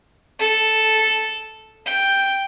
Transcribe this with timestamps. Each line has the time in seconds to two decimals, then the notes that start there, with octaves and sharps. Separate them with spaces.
0.39 A4
1.86 G5